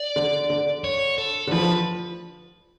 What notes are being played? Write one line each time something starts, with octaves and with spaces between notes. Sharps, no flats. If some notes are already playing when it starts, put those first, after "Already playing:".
Already playing: D5
D3
D3
C#5
A4
D3
F3 B4